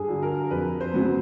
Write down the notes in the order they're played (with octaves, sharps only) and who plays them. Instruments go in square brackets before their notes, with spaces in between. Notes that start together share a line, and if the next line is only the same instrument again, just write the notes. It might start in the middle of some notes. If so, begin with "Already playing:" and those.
Already playing: [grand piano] G2 G#4
D3 F#3
A#4
F2 B4
C5
C#3 F#3 B3